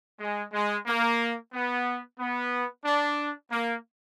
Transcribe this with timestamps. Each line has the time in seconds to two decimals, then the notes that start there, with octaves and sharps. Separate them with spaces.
0.20 G#3
0.53 G#3
0.87 A#3
1.53 B3
2.19 B3
2.85 D4
3.52 A#3